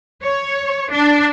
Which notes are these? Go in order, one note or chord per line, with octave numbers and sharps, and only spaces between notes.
C#5
D4